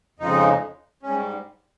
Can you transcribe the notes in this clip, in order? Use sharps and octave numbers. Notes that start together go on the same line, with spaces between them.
F2 C#3 F3 G#3 D#4
G#2 G3 C#4